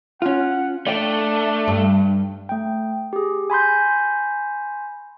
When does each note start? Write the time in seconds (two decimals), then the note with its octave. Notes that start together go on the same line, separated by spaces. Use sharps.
0.22 C#4 F4 F#5
0.87 A3 D4 D5 F5 G5
1.68 G2
2.49 A3 G5
3.13 G4 G#4
3.50 G#5 B5 C6 G6